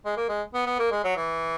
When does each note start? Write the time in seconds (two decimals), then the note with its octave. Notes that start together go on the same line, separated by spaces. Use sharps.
0.05 G#3
0.17 A#3
0.29 G#3
0.54 B3
0.66 B3
0.79 A#3
0.91 G#3
1.04 F#3
1.17 E3